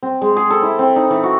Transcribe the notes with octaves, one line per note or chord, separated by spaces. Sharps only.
C4
G#3
G#4
A4
E4
C4
D#4
E3
F#4